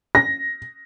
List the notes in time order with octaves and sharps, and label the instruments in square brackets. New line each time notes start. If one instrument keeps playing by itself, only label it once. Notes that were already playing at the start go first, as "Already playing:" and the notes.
[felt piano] A#6